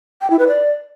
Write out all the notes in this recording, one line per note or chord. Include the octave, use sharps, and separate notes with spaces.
G5
E4
B4
D5